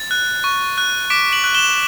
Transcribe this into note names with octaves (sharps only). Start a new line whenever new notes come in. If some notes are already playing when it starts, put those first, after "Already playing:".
Already playing: A6
F#6
C#6
F#6
D6 B6 D7
D7 F#7
F#6
E7 G7